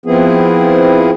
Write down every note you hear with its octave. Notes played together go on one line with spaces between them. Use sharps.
F3 B3 C4 E4 G#4